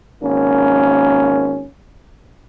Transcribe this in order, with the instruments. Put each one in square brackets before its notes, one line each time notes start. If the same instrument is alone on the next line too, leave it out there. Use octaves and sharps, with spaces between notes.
[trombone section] G#1 A#3 C#4